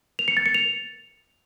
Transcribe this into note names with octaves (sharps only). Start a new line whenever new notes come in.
F7
C#7
A6
C#7
F7